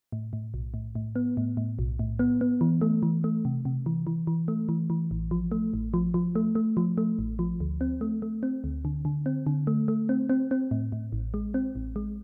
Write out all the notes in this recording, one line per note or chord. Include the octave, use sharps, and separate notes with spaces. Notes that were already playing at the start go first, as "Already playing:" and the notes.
A2
A2
B1
A2
A2
B3
A2
A2
B1
A2
B3
B3
E3
A3
E3
A3
C3
C3
E3
E3
E3
A3
E3
E3
A1
F3
A3
A1
F3
F3
A3
A3
F3
A3
A1
F3
D2
C4
A3
A3
C4
D2
D3
D3
C4
D3
A3
A3
C4
C4
C4
A2
A2
A1
G#3
C4
A1
G#3